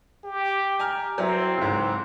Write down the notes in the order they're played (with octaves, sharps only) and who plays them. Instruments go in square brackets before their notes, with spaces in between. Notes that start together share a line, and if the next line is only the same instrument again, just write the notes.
[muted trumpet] G4
[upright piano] G#5 A#5 F6
[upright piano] F#3 E4 [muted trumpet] C4
[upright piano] C#2 G#2